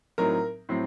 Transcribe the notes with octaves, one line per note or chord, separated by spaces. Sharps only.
A2 F#3 C4 D#4 A#4
A2 F#3 C4